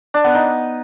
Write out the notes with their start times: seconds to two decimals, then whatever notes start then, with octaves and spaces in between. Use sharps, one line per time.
0.14 D4
0.24 B3
0.34 D#4